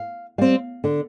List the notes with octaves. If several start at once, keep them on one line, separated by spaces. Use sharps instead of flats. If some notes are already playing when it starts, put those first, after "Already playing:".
Already playing: F5
G3 C4 F5
D3